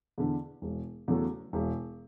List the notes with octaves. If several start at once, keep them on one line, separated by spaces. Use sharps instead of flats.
E2 D3
E1
E2 C#3 F#3 A3
E1